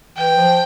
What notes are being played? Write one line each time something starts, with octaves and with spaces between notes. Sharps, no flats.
E3 G5
F3